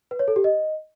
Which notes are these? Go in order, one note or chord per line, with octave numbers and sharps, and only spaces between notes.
B4
C#5
A4
G4
D#5